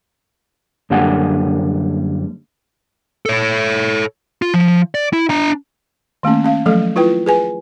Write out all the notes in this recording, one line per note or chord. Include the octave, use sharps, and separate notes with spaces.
F#2 D3 G3 A#3 F#5 G#5
A4 C#5
F4
F3
D5
E4
D4 A#5
D#3 A3 A#3 C#4
C#4 F5
F3 F#3 A3 A4
E4 F4 B4 G5
G#4 B4 G#5